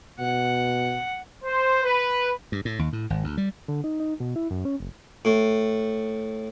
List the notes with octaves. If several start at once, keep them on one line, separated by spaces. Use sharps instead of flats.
B2 F#5
C5
B4
G2
A2
D#2
A2
G#1
D2
G3
D3
D#4
D#4
B2
E4
F#2
C#4
F#1
A2